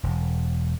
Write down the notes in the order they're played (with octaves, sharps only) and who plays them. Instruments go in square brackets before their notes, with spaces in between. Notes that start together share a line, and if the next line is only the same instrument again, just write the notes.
[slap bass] E1